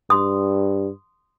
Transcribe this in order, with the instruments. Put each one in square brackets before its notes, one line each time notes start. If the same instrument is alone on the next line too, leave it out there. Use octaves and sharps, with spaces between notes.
[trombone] G2 [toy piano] C6 D#6